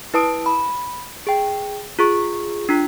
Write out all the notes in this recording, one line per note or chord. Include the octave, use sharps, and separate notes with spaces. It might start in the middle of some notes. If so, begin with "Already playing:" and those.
E4 B4 A5 D#6 D7
B5
G#4 G5
F4 G#4 C#6 B6
D4 F4